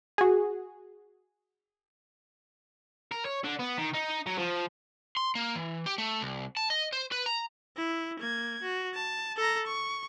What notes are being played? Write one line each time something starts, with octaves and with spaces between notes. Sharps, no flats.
F#4 G#4
A#4
C#5
D3
B3
D#3
D#4
F#3
F3
C6
A#3
E3
G4
A3
C2
A5
D#5
C5
B4
A#5
E4
A#3 G#6
F#4
A5
A4 A#5
C#6